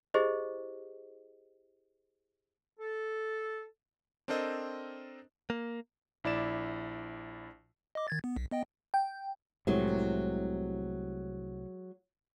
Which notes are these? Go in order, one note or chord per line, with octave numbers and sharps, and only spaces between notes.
E4 G4 G#4 C5 D#5
A4
C4 D4 A4 A#4 C5 D#5
A#3
A#1 E4 D5 E7
D#5 D6
D#3 G#6 A6
B3
B1
B3 D#5 G5
G5
C2 A2 C3 F#3 G#3